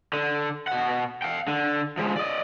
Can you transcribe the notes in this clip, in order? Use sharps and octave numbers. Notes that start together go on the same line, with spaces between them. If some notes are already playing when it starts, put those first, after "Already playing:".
D3
B2 F#5
F5 G5
D3
F3 G#3
D5 D#5